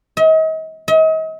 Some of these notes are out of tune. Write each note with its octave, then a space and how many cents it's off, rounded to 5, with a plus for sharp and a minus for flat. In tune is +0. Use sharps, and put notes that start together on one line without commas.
D#5 +40
D#5 +40